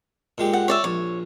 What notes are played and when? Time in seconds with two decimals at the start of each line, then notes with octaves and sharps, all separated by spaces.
0.38 A#2 G#3 G4
0.53 F#5
0.68 C#5 D5 E5
0.84 A#1 C#5